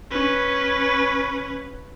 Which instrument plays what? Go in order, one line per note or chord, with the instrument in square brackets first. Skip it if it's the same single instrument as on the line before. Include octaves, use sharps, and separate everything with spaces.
[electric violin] C#4 B4